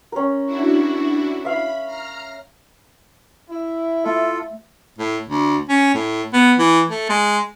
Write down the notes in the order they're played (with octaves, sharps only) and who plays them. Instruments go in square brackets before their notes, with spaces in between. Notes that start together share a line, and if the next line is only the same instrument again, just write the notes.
[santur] C#4 A#4
[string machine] D4 E4 F#4
[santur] E5 F5 [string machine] B5
[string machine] A#5 F6
[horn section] E4
[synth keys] A3 E5 [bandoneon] F4 A4
[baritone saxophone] A2
D2
C#4
A2
B3
E3
A3
G#3